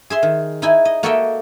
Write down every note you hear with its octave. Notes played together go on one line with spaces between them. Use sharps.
G#4 E5 C6
D#3
D#4 E4 G#5
D#5
A#3 F#4 A4 D#5 E5 G5